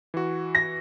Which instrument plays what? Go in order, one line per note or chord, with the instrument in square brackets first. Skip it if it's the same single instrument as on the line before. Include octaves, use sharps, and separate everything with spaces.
[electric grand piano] E3 F#4
[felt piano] A#6